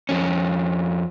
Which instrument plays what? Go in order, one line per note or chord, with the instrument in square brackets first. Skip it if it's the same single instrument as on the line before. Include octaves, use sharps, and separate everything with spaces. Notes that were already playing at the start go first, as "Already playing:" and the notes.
[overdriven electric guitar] F2 C#4